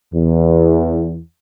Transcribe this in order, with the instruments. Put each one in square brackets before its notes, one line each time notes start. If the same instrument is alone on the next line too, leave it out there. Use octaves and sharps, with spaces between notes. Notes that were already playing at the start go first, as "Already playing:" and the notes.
[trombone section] E2